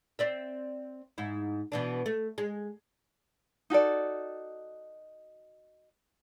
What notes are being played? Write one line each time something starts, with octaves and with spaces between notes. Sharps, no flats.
C4 D5 E5
G#2 E4
B2 E3 D4
A3
G#3
D#4 F#4 A4 D5